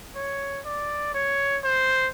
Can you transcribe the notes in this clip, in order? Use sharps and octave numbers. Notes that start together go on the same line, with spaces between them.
C#5
D5
C#5
C5